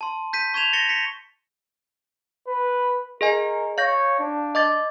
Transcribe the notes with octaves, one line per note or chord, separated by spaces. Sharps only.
A5 C6
G6 B6 D#7
C#6 G#6 E7 F7
A6 A#6 C#7 G7
B6 C#7
B4
G#4 A#4 D#5 G#5
C#5 F5 G6 A#6
D4
D#5 D6 A6